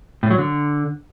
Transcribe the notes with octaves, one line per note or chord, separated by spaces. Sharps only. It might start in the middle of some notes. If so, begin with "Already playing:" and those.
A2
F#3
D3